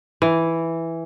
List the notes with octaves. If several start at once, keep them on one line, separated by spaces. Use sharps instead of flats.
E3